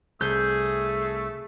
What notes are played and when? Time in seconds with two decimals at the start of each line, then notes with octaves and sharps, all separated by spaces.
0.21 C2 A3 G#4 G6